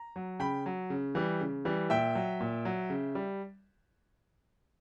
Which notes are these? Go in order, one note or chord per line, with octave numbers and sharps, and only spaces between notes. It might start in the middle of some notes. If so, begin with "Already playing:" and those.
Already playing: A#5
F#3
C#3 G5 B5
F#3
C#3
E3 G3
C#3
E3 G3
A#2 E5 G5
F#3
A#2
F#3
C#3
G3